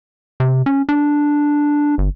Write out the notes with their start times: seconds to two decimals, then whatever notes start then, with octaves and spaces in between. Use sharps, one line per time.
0.40 C3
0.66 C#4
0.89 D4
1.98 G1